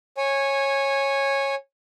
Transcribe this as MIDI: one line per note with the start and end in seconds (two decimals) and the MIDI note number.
0.17 1.55 73
0.17 1.55 80